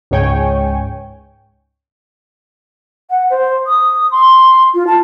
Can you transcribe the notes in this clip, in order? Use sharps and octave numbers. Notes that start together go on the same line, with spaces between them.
C#2 G#2 C#5 G5 G#5
F#5
C5
D#6
C6
F4
A5